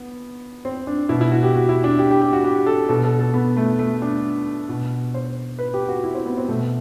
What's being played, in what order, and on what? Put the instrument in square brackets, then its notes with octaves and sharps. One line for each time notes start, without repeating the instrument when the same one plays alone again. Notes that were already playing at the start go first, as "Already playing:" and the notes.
Already playing: [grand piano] B3
C4
D4
B2 E4
E4
F#4
G4
F#4
E4
D4
G4
G4
G4
F#4
G4
A4
B2 A4
A4
A4
B3
A3
A3
D4
B2
C5
B4
G4
F#4
E4
C4
B3
C4
B2 A3